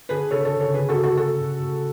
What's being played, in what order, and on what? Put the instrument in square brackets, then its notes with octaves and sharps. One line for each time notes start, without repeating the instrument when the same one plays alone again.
[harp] D3 [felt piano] G#4 B4
[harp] C#3 [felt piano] A4 C#5
[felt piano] A4 C#5
[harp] C#3
[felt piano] A4 C#5
[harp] C#3 [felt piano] G#4 B4
[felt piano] F#4 A4
[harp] C#3
[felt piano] F#4 A4
[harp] A3 [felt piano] F#4 A4
[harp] A2
A2